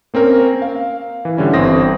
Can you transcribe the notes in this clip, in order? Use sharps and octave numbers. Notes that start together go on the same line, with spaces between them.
A#3 C4 C#4 A#4 C#5
F5
E3
D3 G3 C#4 E4
G1 E3 C4 C6 D#6 A#6